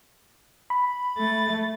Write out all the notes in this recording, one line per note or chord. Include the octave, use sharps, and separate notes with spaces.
B5
A3 A6